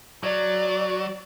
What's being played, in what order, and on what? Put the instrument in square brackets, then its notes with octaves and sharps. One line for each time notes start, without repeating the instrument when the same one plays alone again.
[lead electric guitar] F#3 [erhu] D5